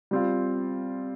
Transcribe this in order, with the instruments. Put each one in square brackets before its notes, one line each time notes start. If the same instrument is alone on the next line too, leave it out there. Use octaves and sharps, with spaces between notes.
[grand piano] G3 C4 F4